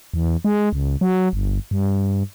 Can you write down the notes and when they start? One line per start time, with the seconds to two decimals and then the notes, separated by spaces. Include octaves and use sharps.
0.14 E2
0.45 G#3
0.73 C#2
1.01 F#3
1.33 G1
1.71 G2